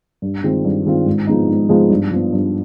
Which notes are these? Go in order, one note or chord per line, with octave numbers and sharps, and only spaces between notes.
G2
D#3 G#3 C4 F4
G2
D#3 G#3 C4 F4
G#2
F3 G#3 B3 D#4
G#2
F3 G#3 B3 D#4
G2
F3 B3
G2